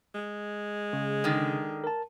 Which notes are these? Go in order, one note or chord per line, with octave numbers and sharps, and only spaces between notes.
G#3
C#3
D3 D#3
A#4 A5